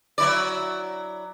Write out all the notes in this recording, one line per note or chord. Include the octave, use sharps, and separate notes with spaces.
F#3 E4 D5